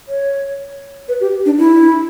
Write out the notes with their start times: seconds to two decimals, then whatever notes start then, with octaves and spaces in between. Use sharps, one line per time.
0.08 C#5
1.08 B4
1.21 G4
1.46 D4
1.58 E4